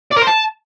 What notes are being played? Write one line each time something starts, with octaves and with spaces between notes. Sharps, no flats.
D5
A#4
C5
A5